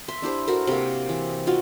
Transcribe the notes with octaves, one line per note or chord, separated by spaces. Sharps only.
E5 C6
D4 E4 G4 C5
F#4 A4 A#4 C5
C3 A#3
E3
D#4 F4 F#4